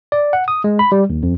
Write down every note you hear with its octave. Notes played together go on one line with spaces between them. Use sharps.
D5
F#5
D#6
G#3
B5
G3
D#2
F2